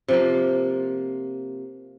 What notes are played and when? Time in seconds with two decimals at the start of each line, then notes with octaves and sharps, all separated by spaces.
0.08 C3 F3 A#3